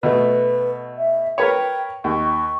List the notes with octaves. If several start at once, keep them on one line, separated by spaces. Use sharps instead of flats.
B2 A3 B4
E5
A#4 B4 C#5 G5
D#2 C#6